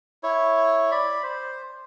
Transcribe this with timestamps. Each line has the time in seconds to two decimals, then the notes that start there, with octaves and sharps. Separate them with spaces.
0.23 E4 C#5
0.91 D5 B5
1.23 C5